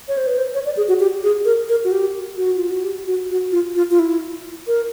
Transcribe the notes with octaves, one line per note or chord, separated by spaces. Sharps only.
C#5
C5
B4
C5
C#5
D5
G#4
F#4
G4
G#4
A#4
A#4
F#4
G4
F#4
F4
F#4
G4
F#4
F#4
F4
F4
F4
E4
A#4